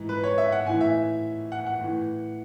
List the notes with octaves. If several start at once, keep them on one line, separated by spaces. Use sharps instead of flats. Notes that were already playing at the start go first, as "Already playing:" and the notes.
Already playing: G#2 E3
B4
C#5
E5
F#5
A2 E3 G#5
E5
F#5
F#5
A2 E3